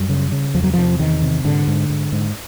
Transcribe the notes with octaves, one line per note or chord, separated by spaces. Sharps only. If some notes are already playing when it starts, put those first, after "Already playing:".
Already playing: F#2 G3
C#3
C#3
E2 F3
F#3
C3 F3
E2 D#3
C3
G#2 D3
G#2
G#2
G#2